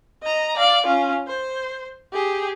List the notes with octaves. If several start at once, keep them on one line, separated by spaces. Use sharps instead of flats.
D#5 A#5
D5 F5
C#4 F4
C5
G4 G#4